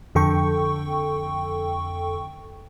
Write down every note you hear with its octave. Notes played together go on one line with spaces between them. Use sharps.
F2 D3 A4 G5 C#6